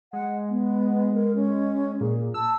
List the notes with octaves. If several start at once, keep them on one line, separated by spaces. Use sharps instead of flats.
G#3 F#5
B3
A#4
C#4
A#2 G#4
A5 E6